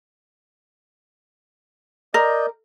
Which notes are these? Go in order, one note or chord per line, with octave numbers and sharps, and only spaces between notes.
A#4 D5 D#5 G6